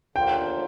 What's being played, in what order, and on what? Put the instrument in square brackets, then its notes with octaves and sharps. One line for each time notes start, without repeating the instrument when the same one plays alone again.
[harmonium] D#2 D3 F3 A#3 F4 [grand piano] G5